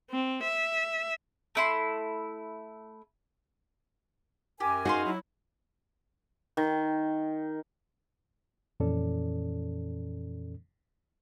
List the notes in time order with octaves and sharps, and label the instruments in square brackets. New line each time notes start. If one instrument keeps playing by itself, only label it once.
[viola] C4
E5
[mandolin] A3 E4 C6
[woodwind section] F#2 A#4 G#5 [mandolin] G4
[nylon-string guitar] D#4 F#4 [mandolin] G#4 F5 C6
[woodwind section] F#3 E4
[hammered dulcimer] D#3
[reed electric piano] F2 A#2 E3 C#4 A4 D5